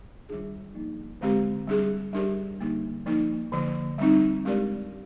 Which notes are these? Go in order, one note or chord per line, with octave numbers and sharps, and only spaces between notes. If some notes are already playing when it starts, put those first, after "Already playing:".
D#3 G3 D4 F4 G#4
F3 A#3 D#4
D3 G#3 C4 G4 A#4
G3 D4 G#4
G3 D4 G4 A#4 D5
D3 G3 A#3 D#4
F3 A#3 D#4 A#4
D3 F3 A#3
G3 C4 D#4
G#3 D4 G4 A#4 D5